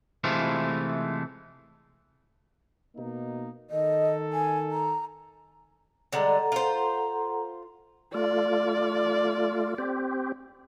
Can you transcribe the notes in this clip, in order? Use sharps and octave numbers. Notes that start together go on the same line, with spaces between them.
C3 E3 G#3 A3 E4 F4
B2 A#3 D#4
D#3 A4 D#5
G#5
A#5
D3 G3 G#3 A4 F#5 A#5
F4 C5
A3 F4 D5
C4 G4